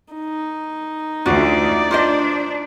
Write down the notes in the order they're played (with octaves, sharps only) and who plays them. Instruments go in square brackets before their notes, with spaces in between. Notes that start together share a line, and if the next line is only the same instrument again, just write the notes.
[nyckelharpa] D#4
[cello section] D2 [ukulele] C#4 F4 F#4 [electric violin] D5
[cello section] D4 [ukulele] F4 C5 D#5